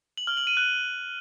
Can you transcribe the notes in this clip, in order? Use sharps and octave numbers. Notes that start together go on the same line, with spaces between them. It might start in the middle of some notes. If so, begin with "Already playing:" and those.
F#7
F6
F#7
D#7
F#6